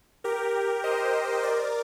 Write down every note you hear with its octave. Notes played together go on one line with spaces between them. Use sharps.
G4 A#4
C5 D#5
A#4 D5